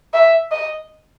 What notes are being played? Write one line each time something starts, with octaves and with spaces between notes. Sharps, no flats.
E5
D#5